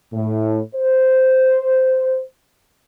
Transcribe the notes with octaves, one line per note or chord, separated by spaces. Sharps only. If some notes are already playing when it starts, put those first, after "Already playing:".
A2
C5